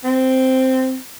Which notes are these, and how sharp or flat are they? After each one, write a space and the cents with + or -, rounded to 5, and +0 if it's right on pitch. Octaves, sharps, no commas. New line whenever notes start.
C4 -5